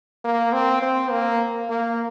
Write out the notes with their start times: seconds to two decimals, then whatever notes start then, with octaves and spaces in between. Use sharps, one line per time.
0.24 A#3
0.53 C4
0.82 C4
1.11 A#3
1.70 A#3